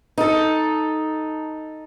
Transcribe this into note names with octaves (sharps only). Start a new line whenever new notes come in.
D#4 A4